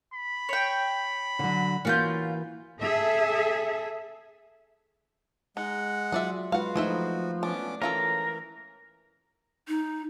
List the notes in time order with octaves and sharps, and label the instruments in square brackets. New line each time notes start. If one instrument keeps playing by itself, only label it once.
[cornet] B5
[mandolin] C#5 G5
[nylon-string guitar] D3 F#3
[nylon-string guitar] E3 A#3 F#4 [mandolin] C#4 F4 G6
[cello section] G#4 A4 E5
[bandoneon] G#3 F#5 [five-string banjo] D#4
[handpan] F#3 F4 [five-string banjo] G#4 D5 E5
[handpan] G#3 F4 B4 [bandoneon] F#4 [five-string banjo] F5 F#5
[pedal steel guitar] F3 [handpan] A3 D#4 E4 [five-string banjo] G#4 C5 E5
[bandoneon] B3 C#4 D6 [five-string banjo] D4
[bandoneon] E3 [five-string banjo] C#4 F4 A4 [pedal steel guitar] A#4
[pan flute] D#4